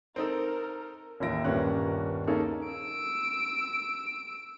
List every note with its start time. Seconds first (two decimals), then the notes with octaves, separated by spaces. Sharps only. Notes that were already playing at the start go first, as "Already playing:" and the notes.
0.16 C4 D#4 A4 A#4
1.20 A1 D#2 F4 E5 A#6 D7
1.44 D#1 G2 A#3 B3 C#4 F#6
2.27 A#3 C#4 D#4 G#4 A4
2.68 E6 D7